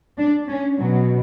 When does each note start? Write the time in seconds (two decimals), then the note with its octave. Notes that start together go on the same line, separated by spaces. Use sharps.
0.18 D4
0.48 C#4
0.78 B2 F#3